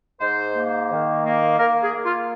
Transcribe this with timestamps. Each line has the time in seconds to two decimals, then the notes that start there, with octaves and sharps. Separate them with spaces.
0.20 G#2 C5
0.55 A#3
0.90 D#3
1.25 A#3
1.59 A#3 A#4
1.83 G#4
1.94 A#3
2.05 F4